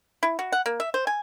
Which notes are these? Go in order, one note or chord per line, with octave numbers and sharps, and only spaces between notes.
E4
F#4
F#5
A#3
E5
C5
G#5